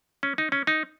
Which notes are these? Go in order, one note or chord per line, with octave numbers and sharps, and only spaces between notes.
C#4
D#4
C#4
D#4